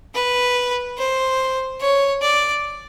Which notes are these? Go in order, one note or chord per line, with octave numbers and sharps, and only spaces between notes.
B4
C5
C#5
D5